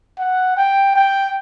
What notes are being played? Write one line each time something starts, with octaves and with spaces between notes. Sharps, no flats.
F#5
G5
G5